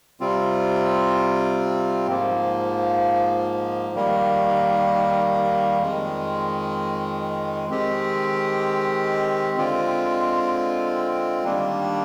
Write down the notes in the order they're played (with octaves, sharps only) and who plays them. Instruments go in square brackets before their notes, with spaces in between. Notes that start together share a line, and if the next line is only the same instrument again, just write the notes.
[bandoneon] C3 G3 C4 F4
G#2 F3 A#3
D#3 G3 A#3
F2 D#3 G#3
D#3 G#3 C4 G4
D3 G#3 C4 F4
D#3 G3 A#3 D4